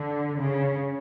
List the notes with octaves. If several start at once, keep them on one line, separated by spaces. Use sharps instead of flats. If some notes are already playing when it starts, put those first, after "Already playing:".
Already playing: D3
C#3